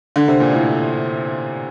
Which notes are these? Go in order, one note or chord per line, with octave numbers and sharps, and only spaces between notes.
D3
C3
A#2
A2